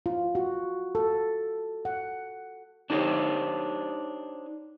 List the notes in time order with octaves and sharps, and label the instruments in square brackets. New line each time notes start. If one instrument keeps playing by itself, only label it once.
[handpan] F4
F#4
A4
F#5
[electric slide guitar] D4 D#4 G4 A#4 C5 C#5